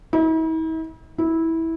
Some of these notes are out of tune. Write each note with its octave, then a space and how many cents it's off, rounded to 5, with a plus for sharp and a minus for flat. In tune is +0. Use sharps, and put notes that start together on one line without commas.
E4 -45
E4 -15